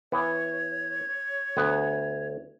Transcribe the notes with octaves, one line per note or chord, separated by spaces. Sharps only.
E3 B3 C#5
D2 B3 B4